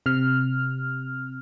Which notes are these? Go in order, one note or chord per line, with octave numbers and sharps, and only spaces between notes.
C3 F6